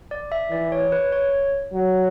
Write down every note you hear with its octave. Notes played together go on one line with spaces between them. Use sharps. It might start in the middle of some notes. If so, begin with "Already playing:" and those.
D5
E5
E3 D5
C#5
B4
C#5
F#3